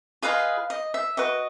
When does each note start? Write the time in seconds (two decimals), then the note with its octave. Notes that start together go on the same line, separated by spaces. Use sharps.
0.22 F4 G#4 B4 D#5 F5
0.70 D#5
0.94 E5
1.17 F#4 B4 D#5